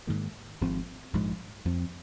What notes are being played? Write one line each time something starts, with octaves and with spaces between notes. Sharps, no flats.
G#2 D#3 A#3
G#1 G#2 F3 C4
A#1 G#2 F3 G#3
F2 F3 C4